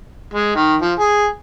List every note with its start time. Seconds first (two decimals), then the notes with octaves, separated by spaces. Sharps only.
0.34 G#3
0.55 D#3
0.81 F3
0.99 G#4